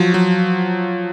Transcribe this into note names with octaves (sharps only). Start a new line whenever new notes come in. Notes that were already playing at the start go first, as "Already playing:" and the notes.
Already playing: F3 F#3
F#3